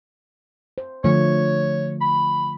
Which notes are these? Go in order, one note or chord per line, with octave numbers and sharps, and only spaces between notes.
C5
D3 F3 A3 C#5
B5